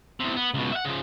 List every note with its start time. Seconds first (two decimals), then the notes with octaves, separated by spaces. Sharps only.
0.20 E2 C3
0.36 B3
0.54 C#2 B2
0.72 E5 F#5
0.85 C#3 F3